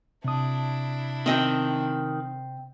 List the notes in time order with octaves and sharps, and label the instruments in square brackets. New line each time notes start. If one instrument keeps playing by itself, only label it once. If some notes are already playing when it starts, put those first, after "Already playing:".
[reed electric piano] C3 D#6 [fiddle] D4 E4
[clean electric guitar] D#3 [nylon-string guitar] C4 D#5 G5